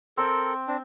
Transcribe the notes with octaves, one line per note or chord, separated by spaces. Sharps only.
C4 A4 A#4 E5 G5
C4 D4